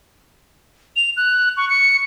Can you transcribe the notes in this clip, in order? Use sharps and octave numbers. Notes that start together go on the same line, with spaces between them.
F7
F#6
C#6
C#7